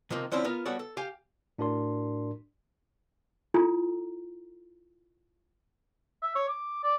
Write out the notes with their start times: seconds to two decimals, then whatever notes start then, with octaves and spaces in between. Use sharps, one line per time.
0.10 C3 D#3 F3 A#3 C4
0.32 D3 F3 C4 C#4 E4
0.44 B3 F4 A#4
0.66 G3 B3 F#4 A4 C#5 D5
0.79 A4
0.97 G4 F5 G5 G#5
1.59 A2 D4 F#4 A#4 D5 C6
3.54 E4 F4 A4 G#5 A#5
6.22 E5
6.35 C#5
6.48 D6
6.83 D5